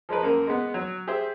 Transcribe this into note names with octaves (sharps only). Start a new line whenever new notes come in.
F3 G#3 A#4 B4
F#2 A#3 A#4
G#3 B3
F#3
G4 G#4 C5 E5